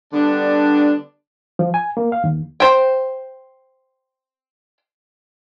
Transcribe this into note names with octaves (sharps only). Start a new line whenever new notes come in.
D3 G3 B3 D4
F3
G#5
A#3
F5
D#2
C5 G5